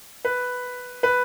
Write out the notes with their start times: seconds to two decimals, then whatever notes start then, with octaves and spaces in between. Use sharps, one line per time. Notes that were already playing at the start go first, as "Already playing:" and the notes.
0.25 B4
1.03 B4